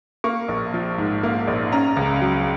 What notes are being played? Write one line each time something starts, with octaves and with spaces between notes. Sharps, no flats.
A#3 C#6
A#1
F3
G#2
A#3
A#1
C#4 A#5
C#2
F#3